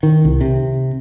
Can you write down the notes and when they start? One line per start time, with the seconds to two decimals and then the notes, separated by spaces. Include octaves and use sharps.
0.03 D#3
0.25 C2
0.41 C3